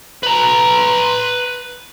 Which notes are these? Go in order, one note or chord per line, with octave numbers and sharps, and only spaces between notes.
B4 A#5